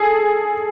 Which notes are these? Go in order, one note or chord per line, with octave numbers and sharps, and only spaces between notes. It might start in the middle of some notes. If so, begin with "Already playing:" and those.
Already playing: G#4 A4